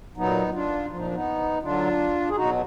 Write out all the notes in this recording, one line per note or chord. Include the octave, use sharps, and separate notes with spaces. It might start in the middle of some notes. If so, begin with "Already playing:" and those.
A#2 F#3 B3 D#4
D4 F4
A#2 F3 F4
D#4
D4
B3 D#4
D3 F#3 D4 F4
G#4
B2 F#3 D#4 F#4